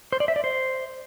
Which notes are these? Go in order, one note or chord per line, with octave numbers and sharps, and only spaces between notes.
C5
D5
E5
D5
C5